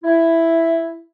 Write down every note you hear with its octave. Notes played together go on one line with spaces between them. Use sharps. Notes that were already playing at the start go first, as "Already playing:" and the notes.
E4